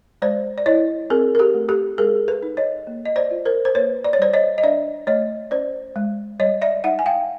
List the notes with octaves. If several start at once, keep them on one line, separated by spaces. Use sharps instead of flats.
G#3 C5 D5
D5
E4 C#5 D#5
C4 G#4 A#4
A#4
G4 A4
A3
G4 A4
G#3 G#4 A#4
A4 B4
D#4
C#5 D#5
A#3
D#5
C5 D5
F4
A#4 C5
C5
A#3 B4 C#5
D5
C#5
G3 C5 D5
C#5 D#5
D#5
D4 D5 E5
A3 C#5 D#5
C#4 C5 D5
G#3
G3 C#5 D#5
D5 E5
D#4 E5 F#5
G#5
F5 G5